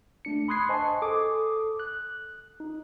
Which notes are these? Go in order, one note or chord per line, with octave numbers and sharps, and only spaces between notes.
A3 D4 C#7
B5 C6 D#6 F#6 G#6 C7
C5 D#5 G#5 A5 C6 C#6
A4 D6 D#6
F#6
D#4